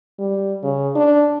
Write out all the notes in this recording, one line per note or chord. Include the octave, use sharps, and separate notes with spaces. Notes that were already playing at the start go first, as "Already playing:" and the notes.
G3
C#3
D4